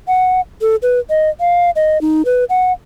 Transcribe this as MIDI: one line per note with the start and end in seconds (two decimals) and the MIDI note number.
0.08 0.41 78
0.61 0.76 69
0.82 1.00 71
1.10 1.30 75
1.40 1.70 77
1.76 2.00 75
2.01 2.22 63
2.25 2.44 71
2.50 2.72 78